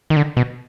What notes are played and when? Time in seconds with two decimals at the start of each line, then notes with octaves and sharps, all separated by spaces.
0.10 D#3
0.16 D3
0.37 B2